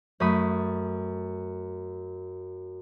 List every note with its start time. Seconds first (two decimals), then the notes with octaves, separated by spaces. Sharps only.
0.20 F#2 A3 B5 D#6